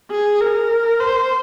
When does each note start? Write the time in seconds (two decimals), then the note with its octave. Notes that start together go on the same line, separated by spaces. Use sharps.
0.10 G#4
0.40 A#4
1.00 C5